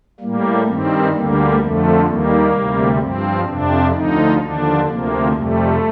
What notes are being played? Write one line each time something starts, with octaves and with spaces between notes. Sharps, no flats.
A2 G3 A#3
G2 D#3 G3 C4
D2 D3 G3 A#3
F2 D3 F3 A3
D#2 D#3 G3 A#3
D2 C3 G3
G2 F3 C4
F2 C3 F3 D4
D2 D3 F3 D#4
D#2 D3 F3 D4
D2 C3 F3 A#3
F2 C3 G3 A3